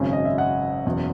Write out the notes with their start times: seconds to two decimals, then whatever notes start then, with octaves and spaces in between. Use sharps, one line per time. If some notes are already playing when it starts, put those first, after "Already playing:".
Already playing: G#1 F#2 C#3 G#5
0.13 D#5
0.25 E5
0.38 F#5
0.86 F#1 E2 B2